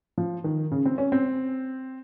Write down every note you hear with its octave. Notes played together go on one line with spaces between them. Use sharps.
F3
D#3
C#3
C4
C#4
C4